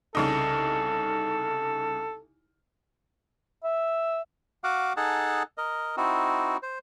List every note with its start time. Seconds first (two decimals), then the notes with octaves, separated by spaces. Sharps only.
0.15 C2 C#3 D#4 A4
3.64 E5
4.64 F#4 F5 F#5 D6
4.97 D#4 G#4 A4 F#5 A5
5.58 A#4 D#5
5.97 C4 D#4 E4 F#4
6.63 C5